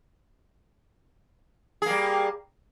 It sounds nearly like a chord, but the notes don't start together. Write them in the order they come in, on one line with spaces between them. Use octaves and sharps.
G#4 A#3 G3